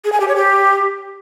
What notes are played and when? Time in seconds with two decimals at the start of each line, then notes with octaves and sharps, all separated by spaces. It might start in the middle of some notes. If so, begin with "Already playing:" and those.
0.05 G#4
0.13 G#5
0.20 G4
0.28 C#5
0.36 G4